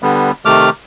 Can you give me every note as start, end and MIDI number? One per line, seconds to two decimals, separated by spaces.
0.03 0.31 50
0.03 0.31 55
0.03 0.31 59
0.45 0.70 48
0.45 0.70 51
0.45 0.70 57
0.45 0.70 86
0.45 0.70 89